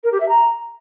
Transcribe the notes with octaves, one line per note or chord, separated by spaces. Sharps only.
A#4
G4
E5
A#5